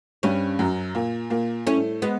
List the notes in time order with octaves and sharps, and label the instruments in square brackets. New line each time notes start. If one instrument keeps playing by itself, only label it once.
[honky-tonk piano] G2 G3 [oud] C#4
[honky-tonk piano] F#2 F#3
A#2 A#3
A#2 A#3
[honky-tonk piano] A2 A3 [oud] C#4
[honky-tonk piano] G#3 [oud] B3